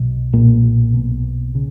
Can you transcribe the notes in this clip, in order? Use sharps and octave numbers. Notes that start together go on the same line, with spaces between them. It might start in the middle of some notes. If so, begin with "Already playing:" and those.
Already playing: B1 B2
B1 A#2 A#3
B1 B2
C#3